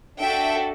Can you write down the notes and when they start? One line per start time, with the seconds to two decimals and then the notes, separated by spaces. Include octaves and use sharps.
0.20 D4 F#4 A4 E5 G5